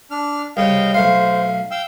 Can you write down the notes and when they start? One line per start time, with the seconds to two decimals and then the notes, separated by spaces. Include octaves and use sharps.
0.11 D4 F6
0.57 C2 C#3 D#5 F5 G5
0.94 B1 A3 C5 F5
1.71 F5 G5 E6